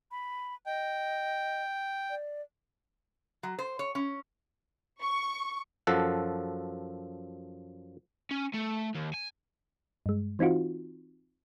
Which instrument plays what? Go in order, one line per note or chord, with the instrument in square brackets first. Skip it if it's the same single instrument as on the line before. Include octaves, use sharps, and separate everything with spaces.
[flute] B5
[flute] D#5 [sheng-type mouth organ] G5
[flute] D5
[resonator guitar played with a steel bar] F#3
C5
C#5
C#4
[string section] C#6
[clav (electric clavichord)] F#2 F3 A4 F#5
[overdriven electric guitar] C#4
A3
D#2
G#5
[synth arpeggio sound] G2 G#3
E3 C4 D#4 F4 F#4